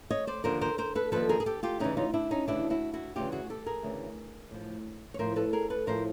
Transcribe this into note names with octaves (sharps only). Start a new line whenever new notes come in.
C#5 D#5
C5 D5
D#2 D3 F3 A#4 C5
A#4 C5
A#4 C5
A4 B4
D#2 D3 F3 A4 B4
G#4 A#4
G#4
G4 A4
F4 G4
D2 C#3 E3 C#4 D#4
D#4 F4
D4 E4
C#4 D#4
D2 C#3 E3 D4 E4
E4 F#4
E4 F#4
D2 C#3 E3 F4 G4
F#4 G#4
G4 A4
G#4 A#4
D2 C#3 E3
A2 F3
C#5
A2 F3 A#4 C5
A4 B4
G#4 A#4
A4 B4
A2 F3 A#4 C5